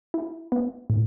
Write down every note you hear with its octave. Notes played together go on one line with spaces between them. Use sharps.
E4
B3
A2